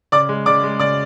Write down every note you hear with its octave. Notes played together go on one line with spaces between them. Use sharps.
C#3 D5 D6
G#3
C#3 D5 D6
G#3
C#3 D5 D6